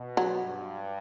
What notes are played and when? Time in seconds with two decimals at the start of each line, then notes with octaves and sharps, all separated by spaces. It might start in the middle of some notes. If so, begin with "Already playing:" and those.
Already playing: B2
0.17 F#3
0.44 G2